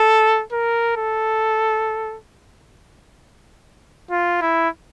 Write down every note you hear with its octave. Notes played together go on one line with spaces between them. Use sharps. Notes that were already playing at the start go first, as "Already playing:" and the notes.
Already playing: A4
A#4
A4
F4
E4